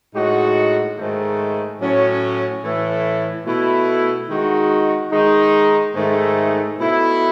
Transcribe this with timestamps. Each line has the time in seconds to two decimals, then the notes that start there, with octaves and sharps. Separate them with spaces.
0.13 A2 G#3 D#4 F#4
0.97 G#2 D#3 A3
1.79 A2 F#3 C#4
2.63 A2 E3 A3 E4
3.45 B2 A3 E4
4.28 D#3 G#3 D#4 F#4
5.11 D#3 G#3 D#4
5.95 G#2 D#3 A3
6.78 B2 A3 E4